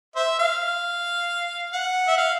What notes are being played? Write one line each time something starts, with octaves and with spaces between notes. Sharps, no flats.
C5 E5
F5
F#5
E5
F5